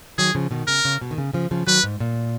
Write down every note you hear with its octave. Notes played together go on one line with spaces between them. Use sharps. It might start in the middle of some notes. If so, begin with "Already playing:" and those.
D#3 F#3 G#4
C#3 F3
B2 D#3
C#3 A#4
C#3
B2
D#3
C#3
C#3 F3
C#3 F3
D#3 F#3 B4
G#2
A#2